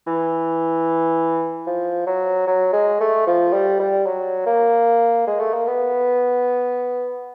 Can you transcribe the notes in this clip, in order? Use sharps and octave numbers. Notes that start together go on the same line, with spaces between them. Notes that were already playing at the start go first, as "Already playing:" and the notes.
E3
F3
F#3
F#3
G#3
A3
F3
G3
G3
F#3
A#3
G#3
A3
A#3
B3